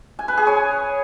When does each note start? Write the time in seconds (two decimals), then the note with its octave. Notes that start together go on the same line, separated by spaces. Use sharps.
0.19 G#5
0.28 B4
0.37 G#4
0.47 C#5